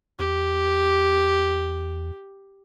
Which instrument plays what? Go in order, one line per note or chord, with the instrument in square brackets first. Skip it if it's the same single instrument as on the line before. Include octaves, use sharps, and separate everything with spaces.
[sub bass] E2 [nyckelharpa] G4